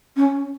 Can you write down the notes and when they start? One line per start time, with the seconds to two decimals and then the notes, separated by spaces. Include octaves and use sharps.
0.17 C#4